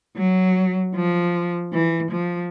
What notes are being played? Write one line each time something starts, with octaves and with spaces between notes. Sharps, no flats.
F#3
F3
E3
F3